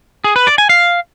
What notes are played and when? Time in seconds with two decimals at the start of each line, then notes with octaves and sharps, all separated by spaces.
0.24 G#4
0.36 B4
0.47 D5
0.58 G#5
0.69 F5